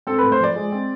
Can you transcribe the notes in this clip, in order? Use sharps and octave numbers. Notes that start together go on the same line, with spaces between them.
C4 A4
A2 B4
C5
F3 D5
G#3
C4